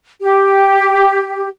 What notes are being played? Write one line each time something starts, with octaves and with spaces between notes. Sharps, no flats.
G4